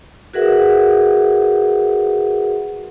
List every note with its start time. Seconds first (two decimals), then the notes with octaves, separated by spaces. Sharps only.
0.33 F#4 G#4 A#4 B4 E5 F#5